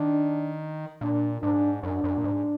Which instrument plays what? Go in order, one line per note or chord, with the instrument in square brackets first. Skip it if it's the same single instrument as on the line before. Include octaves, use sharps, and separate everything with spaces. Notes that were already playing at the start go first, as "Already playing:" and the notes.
Already playing: [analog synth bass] D#3 [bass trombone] D4
[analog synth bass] A#2 [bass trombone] D4
[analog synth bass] G#2 [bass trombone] D4
[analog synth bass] F#2 [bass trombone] D4
[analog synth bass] F#2
A#2
G#2